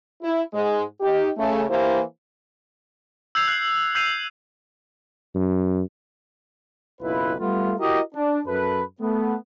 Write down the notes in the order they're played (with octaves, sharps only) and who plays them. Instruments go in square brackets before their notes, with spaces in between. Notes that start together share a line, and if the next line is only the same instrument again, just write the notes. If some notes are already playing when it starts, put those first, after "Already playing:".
[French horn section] E4
G#2 G#3
D#4 G4
C#3 A3
E3 A#3 E4 G4 C5
[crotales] E6 G6 G#6 C7 F7
F#6 G6 C7 F#7
E6 G6 C7 D#7 F7
[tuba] F#2
[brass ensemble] F#1 B1 E4 F4 B4
G3 A3 B3 F4
E4 F#4 G4 A#4 D#5
D4
F#2 A4 B4
A3 B3